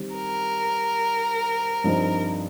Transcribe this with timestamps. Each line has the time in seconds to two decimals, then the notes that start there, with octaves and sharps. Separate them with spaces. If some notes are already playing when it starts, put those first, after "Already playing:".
Already playing: D#3 G3 C4
0.15 A#4
1.84 G2 F3 C4 D#4